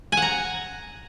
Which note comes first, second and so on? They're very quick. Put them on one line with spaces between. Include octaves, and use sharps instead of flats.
G#5 F#5 A#5